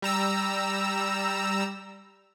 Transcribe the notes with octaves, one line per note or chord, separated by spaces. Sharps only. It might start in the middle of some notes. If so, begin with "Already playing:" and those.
G3 A#5 E6